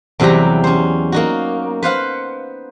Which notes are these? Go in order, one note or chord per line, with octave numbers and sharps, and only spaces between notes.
E2 C3 F#3 G3 G4 A#5
C#4 C5
A#3 D#4 F#4
B4 C5 F5 F#5